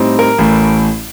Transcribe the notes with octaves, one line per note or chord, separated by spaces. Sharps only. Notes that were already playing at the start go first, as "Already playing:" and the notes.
Already playing: A2 G3 C4 D#4
A#4
A1 A2 A3